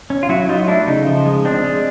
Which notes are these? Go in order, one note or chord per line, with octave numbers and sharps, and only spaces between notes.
C#4
F4
F#3 E4 F#4
F#3 D#4 F4
A3 D4 E4
C#3 D#4
F3
G#3
C4 D4
G#3